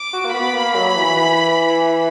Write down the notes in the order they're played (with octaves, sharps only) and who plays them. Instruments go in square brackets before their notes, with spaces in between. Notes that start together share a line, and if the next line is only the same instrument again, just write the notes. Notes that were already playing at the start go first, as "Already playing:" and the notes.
Already playing: [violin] D6
[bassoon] F#4
A#3
[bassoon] B3 [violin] B5
[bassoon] A#3
F#3
E3
E3